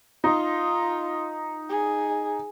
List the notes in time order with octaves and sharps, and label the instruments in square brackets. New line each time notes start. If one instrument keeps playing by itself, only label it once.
[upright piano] D#4 [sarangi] F4
[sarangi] G#4